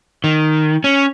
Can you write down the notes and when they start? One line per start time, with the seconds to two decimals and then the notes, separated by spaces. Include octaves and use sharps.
0.24 D#3
0.84 C#4